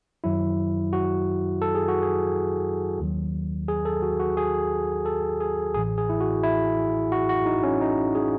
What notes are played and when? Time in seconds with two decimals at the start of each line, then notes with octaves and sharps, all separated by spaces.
0.24 F#2 D#3 F#3 E4
0.93 F#4
1.62 A4
1.75 G#4
1.88 F#4
2.02 G#4
2.99 D#2 D#3 F#3
3.68 G#4
3.85 A4
4.02 F#4
4.20 F#4
4.37 G#4
5.05 A4
5.40 G#4
5.74 A1 A2 E3 G#4
5.98 G#4
6.09 E4
6.20 F#4
6.43 E4
7.12 F#4
7.29 F#4
7.46 D#4
7.63 C#4
7.81 D#4
8.15 G#4